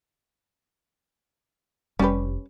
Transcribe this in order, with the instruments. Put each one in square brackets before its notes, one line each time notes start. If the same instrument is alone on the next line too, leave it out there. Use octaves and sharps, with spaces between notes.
[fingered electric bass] F1 [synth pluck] G3 G4 [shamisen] C#4 B4